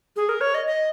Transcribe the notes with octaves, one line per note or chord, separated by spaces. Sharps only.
G#4
A#4
C#5
D#5
D#5